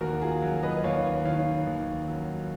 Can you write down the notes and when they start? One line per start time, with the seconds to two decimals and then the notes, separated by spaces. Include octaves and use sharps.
0.01 D#2 F#4 A#4
0.22 F4 G#4
0.42 F#3
0.63 B4 D#5
0.84 D#2 C#5 F5
1.25 D#3 C#5 F5
1.67 D#2
2.08 F#3